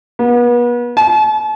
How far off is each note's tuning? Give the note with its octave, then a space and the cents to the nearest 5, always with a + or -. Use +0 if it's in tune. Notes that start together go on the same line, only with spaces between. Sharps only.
B3 -35
A5 -40